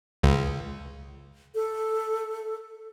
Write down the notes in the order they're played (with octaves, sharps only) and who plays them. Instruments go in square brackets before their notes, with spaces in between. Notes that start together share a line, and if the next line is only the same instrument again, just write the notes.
[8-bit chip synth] C#2
[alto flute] A4